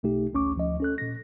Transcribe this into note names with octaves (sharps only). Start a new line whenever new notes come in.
B1 B2 A3 D#4 G4
A1 D2 C#4 C#6 D6
D2 F3 D#5
C#4 A4 F#6
A#2 A#6